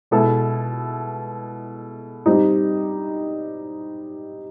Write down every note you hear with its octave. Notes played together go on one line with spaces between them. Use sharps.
B2 G#3 B3 E4 A4
G3 C4 D#4